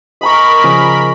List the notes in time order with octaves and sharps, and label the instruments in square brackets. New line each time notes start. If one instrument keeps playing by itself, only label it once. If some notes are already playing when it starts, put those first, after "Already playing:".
[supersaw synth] A#4 B5 [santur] D#5 A#5 C#6
[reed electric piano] C#3 F3 G#4